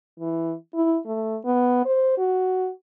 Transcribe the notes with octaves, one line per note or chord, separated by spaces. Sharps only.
E3
E4
A3
B3
C5
F#4